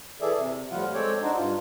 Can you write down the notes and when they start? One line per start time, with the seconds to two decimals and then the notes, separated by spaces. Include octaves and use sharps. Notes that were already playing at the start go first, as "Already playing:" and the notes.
0.21 E3 G#4 A4 D5 E5
0.38 C3
0.71 A2 F3 G3 F4 F5 F#5
0.94 G#3 C4 A4 C#5 D5 G5
1.22 D4 D#4 F#4 C5
1.37 G2 F4